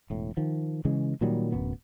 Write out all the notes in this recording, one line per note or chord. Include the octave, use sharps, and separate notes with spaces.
E1 A2
D#3 F3
C#3 E3 G#3
A#2 D#3 F#3 G3
D1 F#2 B3